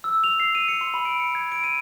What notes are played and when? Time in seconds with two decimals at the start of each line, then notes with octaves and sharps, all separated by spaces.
0.04 E6
0.24 F7
0.40 C7
0.55 D#7
0.68 C#7
0.81 C6
0.94 B5
1.05 D7
1.20 C#7
1.35 G#6
1.52 D7
1.64 D#7